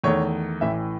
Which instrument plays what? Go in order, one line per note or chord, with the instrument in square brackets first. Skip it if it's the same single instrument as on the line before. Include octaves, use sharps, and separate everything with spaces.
[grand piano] E2 D#3 A3 C#5
A1 A2 E3 E5